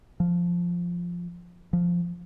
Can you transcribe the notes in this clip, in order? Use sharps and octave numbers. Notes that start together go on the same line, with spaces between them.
F3
F3